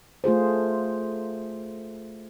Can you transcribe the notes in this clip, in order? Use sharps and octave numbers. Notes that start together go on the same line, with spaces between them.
A3 F4 G#4 C5